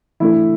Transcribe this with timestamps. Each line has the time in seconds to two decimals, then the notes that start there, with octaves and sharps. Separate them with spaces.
0.20 E3 A3 D4 E4 A4